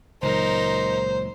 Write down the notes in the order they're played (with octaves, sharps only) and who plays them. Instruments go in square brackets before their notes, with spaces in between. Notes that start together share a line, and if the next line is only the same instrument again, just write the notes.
[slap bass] C#2 A#2 F#3 [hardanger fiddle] D#4 A#4 [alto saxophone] C5